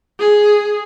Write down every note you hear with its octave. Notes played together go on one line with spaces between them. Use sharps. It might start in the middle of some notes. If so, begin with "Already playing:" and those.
G#4